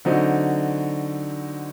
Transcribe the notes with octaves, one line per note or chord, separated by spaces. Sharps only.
D3 F#3 C4 D#4